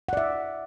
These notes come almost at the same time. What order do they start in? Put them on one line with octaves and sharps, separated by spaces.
F#5 D5 E5